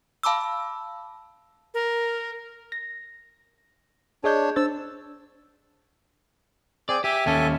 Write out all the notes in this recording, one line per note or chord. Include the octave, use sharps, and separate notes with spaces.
F5 A5 B5 D6 E6
A#4
A#6
D4 G#4 C#5 D#5 G6
D4 C5 E6 A6
C4 G#4 D5
G4 E5 G#5
D#2 C#4 A4 E5 G#5